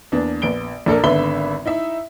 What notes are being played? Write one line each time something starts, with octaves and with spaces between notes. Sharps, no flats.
E2 A#3 D4
A#1 B3 D7 G7
A#1 D4 A4 A#4
G#1 D3 B3 E5 B5 G7
D#4 E4 E5